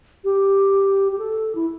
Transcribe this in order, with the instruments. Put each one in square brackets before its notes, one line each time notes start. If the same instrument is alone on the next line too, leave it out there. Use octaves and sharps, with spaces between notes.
[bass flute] G4
G4
A4
E4